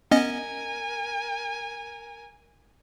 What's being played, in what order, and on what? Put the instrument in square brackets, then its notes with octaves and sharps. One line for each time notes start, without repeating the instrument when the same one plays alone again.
[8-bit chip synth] B3 C#4 D#5 [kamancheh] A#4 G#5